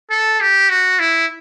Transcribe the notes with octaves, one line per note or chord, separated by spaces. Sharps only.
A4
G4
F#4
E4